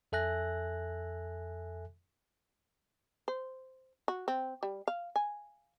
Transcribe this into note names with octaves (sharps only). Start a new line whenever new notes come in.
F2 A4 E5 G#5 F#6 A#6
C5
F#4
C4
G3
F5
G#5